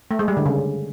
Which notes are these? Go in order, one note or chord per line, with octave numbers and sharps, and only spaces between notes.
A3
G#3
G3
D3
C#3